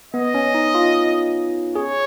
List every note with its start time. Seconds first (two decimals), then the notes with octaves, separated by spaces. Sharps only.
0.14 B3 D#5
0.34 C#4
0.55 D#4
0.75 F4
1.75 G#4 C#5